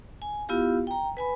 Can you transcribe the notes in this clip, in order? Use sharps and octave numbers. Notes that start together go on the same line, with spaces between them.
G#5
B3 E4 F4 G4 F5
G5 A#5
B4 G#5 B5